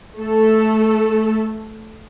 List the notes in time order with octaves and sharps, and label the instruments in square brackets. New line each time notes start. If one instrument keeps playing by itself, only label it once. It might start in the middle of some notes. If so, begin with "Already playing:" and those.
[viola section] A3 A4